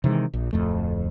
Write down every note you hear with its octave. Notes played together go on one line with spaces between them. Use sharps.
C3 D#3 E3 G#3
A#1
D1 F2 A3